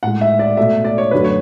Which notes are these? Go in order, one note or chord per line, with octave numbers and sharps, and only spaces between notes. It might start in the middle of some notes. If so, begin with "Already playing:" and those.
A2 G#3 F#5
E5
D5
B2 A3 E5
D5
C#5
F#2 D3 F#3 A3 B4
C#5